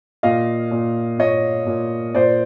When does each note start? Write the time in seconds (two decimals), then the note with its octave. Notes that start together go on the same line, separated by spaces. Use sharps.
0.23 A#2 D#5 F5
0.71 A#2
1.19 A#2 C#5 D#5
1.66 A#2
2.14 A#2 C5 D5